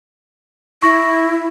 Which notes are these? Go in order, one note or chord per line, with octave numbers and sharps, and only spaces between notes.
E4 C#6 A#6